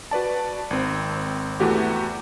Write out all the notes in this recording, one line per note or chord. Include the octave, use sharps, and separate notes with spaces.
F#4 B4 D5 A5
G#1 C4
E2 E3 A3 F#4 G4 C#6